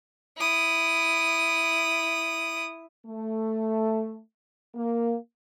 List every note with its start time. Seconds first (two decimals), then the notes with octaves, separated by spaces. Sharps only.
0.37 E4 D#6
3.06 A3
4.75 A#3